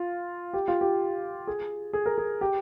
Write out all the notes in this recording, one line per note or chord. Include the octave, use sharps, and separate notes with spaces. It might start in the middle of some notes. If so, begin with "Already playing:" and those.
Already playing: F4
G4
F4
G4
G#4
G#4
A#4
G#4
G4